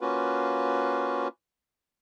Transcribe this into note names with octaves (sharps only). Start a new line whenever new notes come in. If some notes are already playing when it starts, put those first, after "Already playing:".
A#3 C#4 F4 F#4 B4